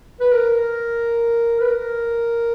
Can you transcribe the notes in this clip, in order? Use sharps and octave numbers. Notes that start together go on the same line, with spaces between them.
B4
A#4
B4
A#4